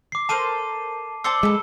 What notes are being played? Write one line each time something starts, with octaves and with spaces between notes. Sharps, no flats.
D6 C7
A4 A#4 C5 A5 D#7
C5 D5 A5 E6 C#7 G7
G#3 A4 B4